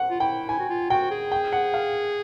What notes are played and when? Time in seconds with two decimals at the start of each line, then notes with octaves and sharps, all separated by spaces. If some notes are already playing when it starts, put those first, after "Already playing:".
Already playing: F#5
0.10 F4
0.20 E4 G5
0.49 E4 G#5
0.59 F#4
0.69 F4
0.90 F#4 G5
1.11 G#4
1.32 G5
1.53 F#5
1.74 F5